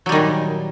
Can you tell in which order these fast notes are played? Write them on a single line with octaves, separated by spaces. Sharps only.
F#3 G3 D#3 A#2